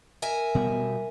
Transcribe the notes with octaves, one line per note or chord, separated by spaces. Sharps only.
A#4 E5 G#5
B2 G3 B3